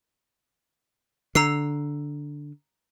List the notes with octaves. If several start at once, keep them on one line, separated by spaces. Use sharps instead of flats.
D3 A#5 E6 C7